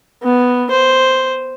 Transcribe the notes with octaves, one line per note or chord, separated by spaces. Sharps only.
B3
C5